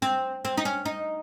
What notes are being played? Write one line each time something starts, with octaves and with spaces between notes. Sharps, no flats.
C4
C4
D#4
C#4
D#4